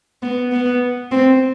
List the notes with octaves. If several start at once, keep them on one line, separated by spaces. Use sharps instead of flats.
B3
B3
C4